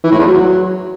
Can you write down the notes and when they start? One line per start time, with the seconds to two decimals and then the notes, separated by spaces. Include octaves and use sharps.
0.04 E3
0.11 A2
0.19 E2
0.27 F#3